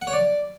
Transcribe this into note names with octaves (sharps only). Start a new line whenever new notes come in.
F#5
C#5
D5